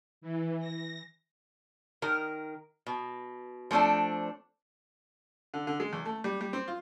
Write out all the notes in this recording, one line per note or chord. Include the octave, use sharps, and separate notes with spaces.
E3
A#6
D#3 A#4
B2
F3 A3 C4 D4 A4
D3
D3
G#3
E2
A3
G3
G3
C4
F4